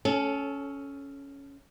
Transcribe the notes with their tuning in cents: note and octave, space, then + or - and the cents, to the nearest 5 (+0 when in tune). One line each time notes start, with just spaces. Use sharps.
C#4 +5 A4 -20